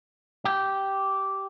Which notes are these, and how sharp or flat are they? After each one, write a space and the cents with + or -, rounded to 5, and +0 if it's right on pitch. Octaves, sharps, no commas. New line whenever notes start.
G4 -10